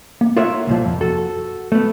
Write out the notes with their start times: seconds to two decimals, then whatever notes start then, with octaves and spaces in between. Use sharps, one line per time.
0.21 A#3
0.37 F4 A#4 C#5 E5 F#5
0.67 C2 A#2 F3
0.86 F2
1.01 F#4 A4
1.72 A3 B3